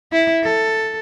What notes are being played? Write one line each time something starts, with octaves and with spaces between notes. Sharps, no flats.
E4
A4